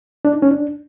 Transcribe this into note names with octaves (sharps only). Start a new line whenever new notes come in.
D4
D#4
C#4
D4